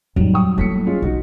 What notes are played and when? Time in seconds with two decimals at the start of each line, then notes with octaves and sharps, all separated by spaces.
0.16 F2 A2 D#3 F#3 G3
0.34 G5 C#6 D#6
0.58 A2 A#3 E4 B6 C#7
0.87 G#3 C#4 F4
1.02 B1 D#4 F#4